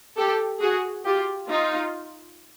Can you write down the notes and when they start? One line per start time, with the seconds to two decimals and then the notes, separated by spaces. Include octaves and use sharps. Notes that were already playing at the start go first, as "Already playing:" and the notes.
0.17 G4 A4
0.61 F#4 G#4
1.05 F4 G4
1.49 D#4 F4